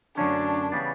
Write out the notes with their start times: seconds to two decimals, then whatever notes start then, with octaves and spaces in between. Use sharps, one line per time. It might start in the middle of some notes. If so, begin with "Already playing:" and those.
0.17 F#2 D3 F#3 A3 C#4 D4
0.72 C#3 E3 G3 B3 D4